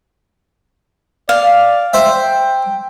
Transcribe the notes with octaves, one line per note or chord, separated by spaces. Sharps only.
D5 F5
C5 E5 G5